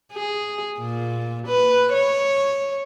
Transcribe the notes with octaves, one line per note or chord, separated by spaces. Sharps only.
G#4
A#2
B4
C#5